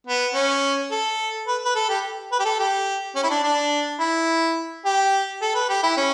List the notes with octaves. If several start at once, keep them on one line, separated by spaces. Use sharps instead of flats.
B3
C#4
A4
B4
B4
A4
G4
B4
G4
A4
G4
C#4
E4
D4
D4
E4
G4
A4
B4
G4
E4
C#4